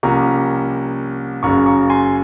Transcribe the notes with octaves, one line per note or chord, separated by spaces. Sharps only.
C2 C3 F3 A#3 C#4 A#5 C#6
F#1 F#2 C#3 A#5 C#6
A#5 C#6
G#5 C6